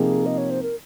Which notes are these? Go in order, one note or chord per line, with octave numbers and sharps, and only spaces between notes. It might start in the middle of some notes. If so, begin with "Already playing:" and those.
Already playing: C3 F3 A#3 D#4 G4 G#4
D#5
C#5
C5
A#4